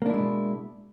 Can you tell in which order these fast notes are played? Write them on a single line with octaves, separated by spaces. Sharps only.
A#3 D4 E4 G#3 B2